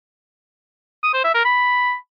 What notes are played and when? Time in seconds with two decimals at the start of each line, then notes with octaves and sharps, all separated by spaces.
1.03 D#6
1.14 C5
1.24 E5
1.35 A#4
1.45 B5